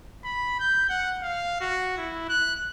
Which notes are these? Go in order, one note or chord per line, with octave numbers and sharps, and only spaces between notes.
B5
G6
F#5
F5
F#4
E4
F#6